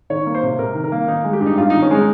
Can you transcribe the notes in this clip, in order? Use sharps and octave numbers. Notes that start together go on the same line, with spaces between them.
D#3 C#5
A#3
C5
C3
C3 A#4
D#3
A#4
A#3
D#3 D#4
G#3
G4
G2
D#4
G2 F4
D#3 D#4
C#4
G#3 D#4